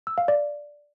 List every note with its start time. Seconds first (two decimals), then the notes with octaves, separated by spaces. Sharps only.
0.07 E6
0.18 F5
0.28 D5